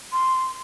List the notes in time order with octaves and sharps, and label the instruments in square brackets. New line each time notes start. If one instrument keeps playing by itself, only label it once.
[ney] C6